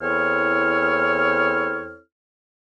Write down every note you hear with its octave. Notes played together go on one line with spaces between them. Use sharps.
E2 C4 E4 A4 C#5 F6